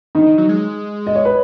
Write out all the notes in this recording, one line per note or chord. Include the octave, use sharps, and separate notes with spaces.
D#3 D#4
D#3
F#3
G#3
D#5
C#5
B4